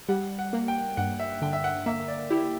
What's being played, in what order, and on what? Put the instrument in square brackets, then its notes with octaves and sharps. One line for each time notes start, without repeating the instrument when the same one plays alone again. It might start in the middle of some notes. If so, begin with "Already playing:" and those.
[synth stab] G3 [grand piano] F#5
[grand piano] F#5
[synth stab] A#3
[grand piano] G5
[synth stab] G2 [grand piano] F#5
[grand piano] E5
[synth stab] D3 [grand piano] G5
[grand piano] E5
F#5
[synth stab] A#3 [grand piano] E5
[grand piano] D5
[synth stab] E4 [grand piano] G4